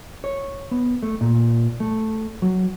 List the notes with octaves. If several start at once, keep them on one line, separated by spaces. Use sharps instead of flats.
C#5
B3
A3
A#2
A3
F#3